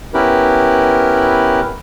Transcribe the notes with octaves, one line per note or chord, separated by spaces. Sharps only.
B3 C#4 E4 G4 A#4 B4